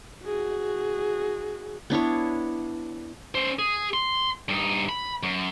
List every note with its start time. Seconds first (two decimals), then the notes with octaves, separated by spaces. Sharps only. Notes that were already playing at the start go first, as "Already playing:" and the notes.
0.25 F#4 G#4
1.90 B3 D4 E4 C#5
3.35 C#4 C5
3.59 G#4
3.94 C6
4.49 G2 D#4
4.89 B5
5.23 F#2